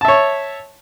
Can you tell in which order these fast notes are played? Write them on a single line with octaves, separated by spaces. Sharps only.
A5 E5 C#5